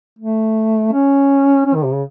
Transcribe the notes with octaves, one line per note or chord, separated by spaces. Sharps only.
A3
C#4
C#4
D#3
C3
C#3